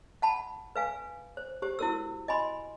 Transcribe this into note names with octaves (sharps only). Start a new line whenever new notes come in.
F#5 A5 B5
B4 F5 G#5
C5
G4 C5
E4 F#4 A#4 E6
D#5 G#5 B5 C6